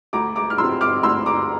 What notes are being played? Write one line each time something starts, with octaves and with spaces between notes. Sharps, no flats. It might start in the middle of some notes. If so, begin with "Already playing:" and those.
D2 A#5 D6
A#5 D6
F6
C3 F3 C6 E6
D6 F6
D2 C6 E6
A#5 D6